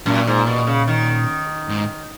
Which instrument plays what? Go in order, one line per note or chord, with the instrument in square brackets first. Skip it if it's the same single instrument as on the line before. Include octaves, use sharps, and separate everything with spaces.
[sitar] F#2 [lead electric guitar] A#2
[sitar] G#2
B2
C#3
D#3
[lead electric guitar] G#2